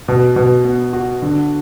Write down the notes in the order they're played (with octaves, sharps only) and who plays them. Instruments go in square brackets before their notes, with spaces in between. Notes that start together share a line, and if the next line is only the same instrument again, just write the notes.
[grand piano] B2
B2
B3
F#4
D3